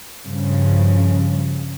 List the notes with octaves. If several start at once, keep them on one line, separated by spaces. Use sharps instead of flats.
G2 C#3 F3